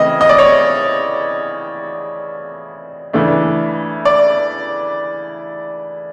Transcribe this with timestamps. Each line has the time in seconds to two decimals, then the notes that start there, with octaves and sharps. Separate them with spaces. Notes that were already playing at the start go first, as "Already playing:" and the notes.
Already playing: C#3 E3 A3 C4 D#5
0.21 D#5
0.29 D5
0.38 C#5
3.13 C#3 E3 A3 D4
4.05 D5